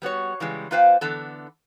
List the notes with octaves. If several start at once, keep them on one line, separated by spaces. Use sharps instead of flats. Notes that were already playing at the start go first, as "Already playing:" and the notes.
G3 B3 F#4 C#5
C#3 E3 G3 G#3
A#3 F4 B4 C5 F5 G5
D3 E3 B3 A4